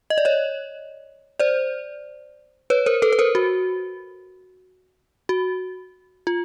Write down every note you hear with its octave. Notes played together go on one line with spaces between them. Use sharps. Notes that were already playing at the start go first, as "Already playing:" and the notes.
D#5
D5
C#5 D#5
C5 D5
B4 C#5
A#4 C5
A4 B4
B4
A#4 C5
F#4
F#4
F4